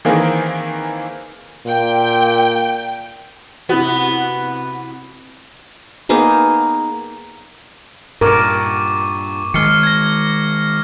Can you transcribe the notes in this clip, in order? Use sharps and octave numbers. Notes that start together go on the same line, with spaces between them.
D#3 E3 A#3 C4 G#4 A#4
A#2 G5
C3 B3 E4 F#4
A#3 B3 D#4 G#4
G2 A#2 A#4 C#6 D6
D#3 G#3 F6 C7 C#7
G#6 A#6